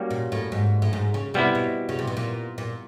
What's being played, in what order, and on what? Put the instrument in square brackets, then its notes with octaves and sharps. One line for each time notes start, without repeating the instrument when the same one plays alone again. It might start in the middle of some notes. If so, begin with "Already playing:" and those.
Already playing: [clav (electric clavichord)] G3 A#3 C#4 F#4
[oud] A#2
A2
G#2
A2
G#2
C#3
[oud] C3 [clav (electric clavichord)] G3 B3 E4
[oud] B2
C#3
C3
B2
A#2
A#2